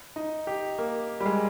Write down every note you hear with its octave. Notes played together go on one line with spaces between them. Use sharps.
D#4
G4
A#3
G3
G#3